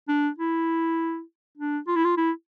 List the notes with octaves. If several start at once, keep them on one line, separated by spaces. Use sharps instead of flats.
D4
E4
D4
F4
E4
F4
E4